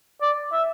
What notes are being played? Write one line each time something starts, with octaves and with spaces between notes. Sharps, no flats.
D5
E5